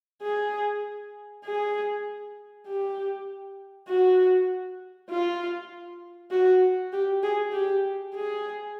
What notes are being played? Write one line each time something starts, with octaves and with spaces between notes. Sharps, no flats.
G#4
G#4
G4
F#4
F4
F#4
G4
G#4
G4
G#4